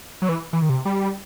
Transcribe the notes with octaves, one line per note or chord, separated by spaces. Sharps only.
F#3
E3
E3
D#3
C3
G3